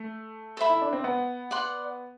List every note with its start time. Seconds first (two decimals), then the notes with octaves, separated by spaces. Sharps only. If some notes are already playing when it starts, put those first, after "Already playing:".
Already playing: A3
0.57 A4 C5 E5 B5
0.70 E4
0.82 D4
0.93 C4
1.04 B3
1.51 D5 F#5 C6